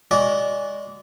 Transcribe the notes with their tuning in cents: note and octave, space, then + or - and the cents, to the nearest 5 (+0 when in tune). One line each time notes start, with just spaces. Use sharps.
G#3 -15 F#4 +0 D5 -20